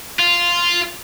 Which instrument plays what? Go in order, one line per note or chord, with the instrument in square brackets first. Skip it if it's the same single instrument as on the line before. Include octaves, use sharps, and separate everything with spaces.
[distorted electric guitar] F4